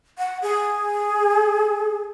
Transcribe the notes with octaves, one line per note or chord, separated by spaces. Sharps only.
F#5
G#4